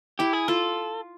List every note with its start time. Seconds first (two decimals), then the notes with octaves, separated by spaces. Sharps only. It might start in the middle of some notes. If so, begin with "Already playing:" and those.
0.19 E4 G4
0.33 G#4
0.48 F4 A4